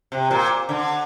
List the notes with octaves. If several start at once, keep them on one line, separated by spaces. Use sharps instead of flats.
C3
A#2
D3